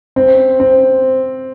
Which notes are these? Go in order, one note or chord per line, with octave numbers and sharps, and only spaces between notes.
C4
C4